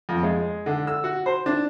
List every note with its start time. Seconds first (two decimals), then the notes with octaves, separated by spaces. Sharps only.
0.09 F2
0.23 G#3
0.66 D3
0.87 E6
1.04 F#4
1.26 C5
1.46 D4